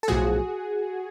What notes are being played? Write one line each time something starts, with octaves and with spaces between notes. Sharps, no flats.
A4
B1 A2 F3 F#4 G#4